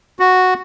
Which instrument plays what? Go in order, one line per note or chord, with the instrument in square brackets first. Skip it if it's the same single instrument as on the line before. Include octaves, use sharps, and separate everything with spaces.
[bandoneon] F#4